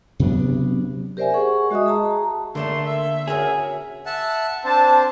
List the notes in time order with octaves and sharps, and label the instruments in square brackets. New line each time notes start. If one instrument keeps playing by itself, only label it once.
[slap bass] C3 F#3 B3 D4
[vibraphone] G4 A#4 C5 D5 E5 G#5
G#4 F#5 C#6
G#3 F#4 D#5 E5 D#6
G#4 A5 A#5
[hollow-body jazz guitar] D3 [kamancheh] A3 C6 [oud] A#3 D4 A4
[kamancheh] E5
[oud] C#4 F#4 A#4 [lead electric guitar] G#4
[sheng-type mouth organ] E5 F#5 A5
[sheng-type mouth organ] C4 D4 C5 [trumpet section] A5